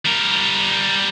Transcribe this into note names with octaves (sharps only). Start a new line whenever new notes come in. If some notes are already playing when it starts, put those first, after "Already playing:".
G3 A#4